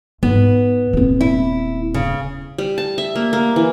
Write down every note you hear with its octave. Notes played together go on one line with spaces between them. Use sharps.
G#2 B3
D#1 C4
E4
C#3
G3
A5
E5
A#3
A#3
E3